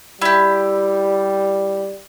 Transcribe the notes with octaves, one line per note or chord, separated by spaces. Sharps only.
G3 E4 G4